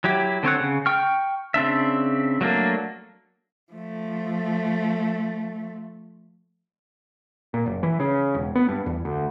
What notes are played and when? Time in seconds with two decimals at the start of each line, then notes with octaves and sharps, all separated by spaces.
0.04 F#3 E4 G4
0.43 D3 C4 C#5 F#5
0.60 C#3
0.86 G5 C#6 F6
1.54 C#3 C4 D4 E5
2.41 F#3 A3 A#3 D4
3.72 F3 A3
7.54 A#2
7.66 F#1
7.83 E3
8.00 C#3
8.35 E1
8.55 B3
8.69 G2
8.86 E2
9.05 D2